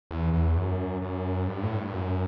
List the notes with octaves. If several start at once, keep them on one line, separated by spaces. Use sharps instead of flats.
E2
E2
F#2
F#2
G2
A2
G2
F#2